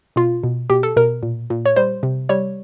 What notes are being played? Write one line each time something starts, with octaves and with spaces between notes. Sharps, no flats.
B2 F4
B2
B2 G4
A4
B2 A#4
A#2
A#2
C#5
G3 C5
C3
G3 C#5